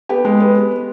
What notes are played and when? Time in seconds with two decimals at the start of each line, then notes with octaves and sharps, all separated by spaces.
0.09 B3 G4
0.25 G#3
0.40 B3